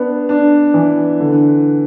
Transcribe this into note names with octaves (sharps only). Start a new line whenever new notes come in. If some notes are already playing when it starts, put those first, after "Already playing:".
Already playing: B3 D4
D4
E3
D3